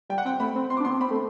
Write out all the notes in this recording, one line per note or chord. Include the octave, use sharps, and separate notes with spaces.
G3 G5
F#5
C4 G5
A3 B5
C4
C6
D6
D4
B3 C6
C4
C4 B5
A3